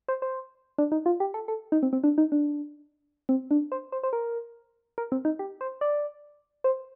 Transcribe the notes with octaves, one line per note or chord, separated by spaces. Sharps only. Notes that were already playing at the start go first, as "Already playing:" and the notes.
C5
C5
D4
D#4
F4
G4
A4
A4
D#4
C4
C4
D4
D#4
D4
C4
D4
C5
C5
C5
A#4
A#4
C4
D#4
G4
C5
D5
C5